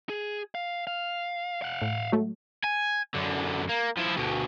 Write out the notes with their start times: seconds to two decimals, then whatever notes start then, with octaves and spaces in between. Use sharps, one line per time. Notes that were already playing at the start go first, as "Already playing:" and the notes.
0.09 G#4
0.55 F5
0.87 F5
1.62 F5 F#5
1.82 A2
2.12 F#3 G#3 A3
2.64 G#5
3.14 F#2 D3
3.69 A#3
3.97 F3 E4
4.17 D2 B2